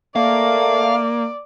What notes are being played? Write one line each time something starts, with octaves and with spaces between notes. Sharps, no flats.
A3 A#3 D5 F5